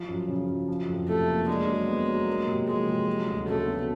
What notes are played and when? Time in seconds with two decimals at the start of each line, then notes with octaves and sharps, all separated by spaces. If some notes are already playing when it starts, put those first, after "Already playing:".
Already playing: F3
0.08 F#2
0.28 C#3
0.48 F#2
0.68 F3
0.88 F2
1.07 C3 A3
1.28 A#3
1.47 G#3 D4
1.68 F#3
1.87 B3
2.08 F#3
2.27 A#3
2.47 C3
2.68 F3 G#3
2.87 C3
3.07 F#3
3.27 D2
3.47 C#3 A3
3.66 B3